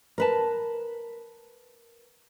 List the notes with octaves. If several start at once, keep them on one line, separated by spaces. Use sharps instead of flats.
A#4 B4 A5